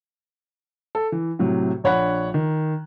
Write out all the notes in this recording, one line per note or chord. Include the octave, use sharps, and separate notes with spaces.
A4
E3
A2 C3 F#3
A#1 D4 C#5 F#5 B5 F#6
D#3